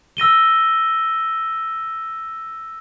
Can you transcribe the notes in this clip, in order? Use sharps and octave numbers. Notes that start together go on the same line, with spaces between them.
E6 A#6 D#7 G7